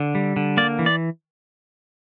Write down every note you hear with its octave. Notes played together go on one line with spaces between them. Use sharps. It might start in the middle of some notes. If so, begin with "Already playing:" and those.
Already playing: D3
G3
D3
A#3 D5
E3
D5